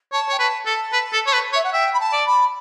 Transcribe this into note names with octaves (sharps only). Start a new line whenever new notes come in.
C#5 A5
C#5 G5
B4 A5
A4 A5
B4
A4
C#5
B4
C#5 E5
F#5
E5 G5
B5
A5
D5
B5